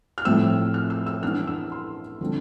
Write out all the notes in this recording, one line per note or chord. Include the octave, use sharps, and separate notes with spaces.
F6
A2 F3 C4 E6
F6
E6
E6
E3 B3 D4 F6
E6
C6
D3 F3 C4